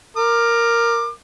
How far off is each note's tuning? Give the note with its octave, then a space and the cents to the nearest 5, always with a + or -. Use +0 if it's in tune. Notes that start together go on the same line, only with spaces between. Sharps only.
A#4 +0 D6 +25